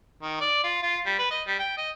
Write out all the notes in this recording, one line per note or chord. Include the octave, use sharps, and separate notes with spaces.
D#3
D5
F4
F4
G3
B4
D#5
G3
G5
D#5